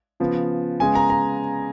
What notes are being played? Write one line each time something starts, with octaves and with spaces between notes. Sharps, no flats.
C#3 F3 B3
C#3 G#3 B3 G#5
A#5
A#5